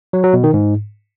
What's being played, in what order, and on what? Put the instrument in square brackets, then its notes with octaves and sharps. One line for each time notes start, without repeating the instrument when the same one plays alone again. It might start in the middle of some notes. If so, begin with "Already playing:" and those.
[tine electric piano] F#3
F#3
B2
D#3
G#2